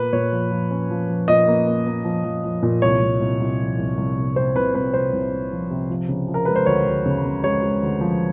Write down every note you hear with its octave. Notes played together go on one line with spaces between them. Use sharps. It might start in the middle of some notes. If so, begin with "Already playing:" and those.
Already playing: A#2 A#3 B4
A#2 C#5
F3
F3
C#4
F3
F3
A#2 D#5
A#3
A#3
A#3
F3
F3
F3
A#2
C2 C#5
C2
C2
C2
F3
C2
C2
C3
C3 C5
C2 B4
C2 B4
C2 C5
C2
C3
F3
C3
F3
C#3
F3
A#4
G#3 B4
C5
D2 C#5
D2
C#3
C#3
G#3 C#5
G#3
D2
F3